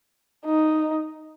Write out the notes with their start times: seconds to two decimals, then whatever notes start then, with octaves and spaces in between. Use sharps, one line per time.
0.45 D#4